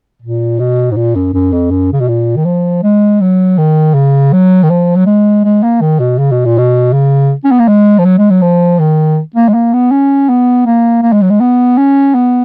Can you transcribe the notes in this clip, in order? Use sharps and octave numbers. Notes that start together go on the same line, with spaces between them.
A#2
B2
G#2
A#2
F#2
F#2
F2
F#2
C#3
B2
A#2
D#3
F3
G#3
F#3
D#3
C#3
F#3
D#3
F3
F#3
G#3
G#3
A#3
D#3
B2
C#3
B2
A#2
B2
C#3
C#4
B3
A#3
G#3
F3
F#3
G#3
F#3
F3
D#3
A#3
G#3
A#3
B3
C#4
B3
A#3
A#3
G#3
F#3
G#3
B3
C#4
B3